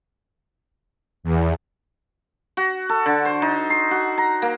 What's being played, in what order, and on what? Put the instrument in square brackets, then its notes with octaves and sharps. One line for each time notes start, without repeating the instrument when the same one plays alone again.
[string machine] E2
[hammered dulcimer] F#4
A4
D3
C5
D#4
C6
F#4
A#5
A#3